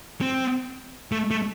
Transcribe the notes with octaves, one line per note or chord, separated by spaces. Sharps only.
C4
A3
A3